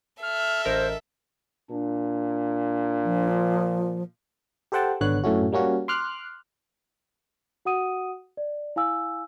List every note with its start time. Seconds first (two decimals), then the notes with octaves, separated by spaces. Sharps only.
0.22 A4 E5 F6
0.65 A1 A#4 C5 D#5
1.71 A#2 D4
3.04 F3
4.72 G4 A4 C5 F#5 G5 A5
5.01 G#1 D3 B3 C#5 F#6
5.24 F#2 A2 A3 C#4 F#4
5.52 G3 A#3 C#4 F#4
5.88 C6 D6 F6 F#6
7.65 F#4 F#5 D#6 D#7
8.37 D5
8.76 E4 F5 G#5 E6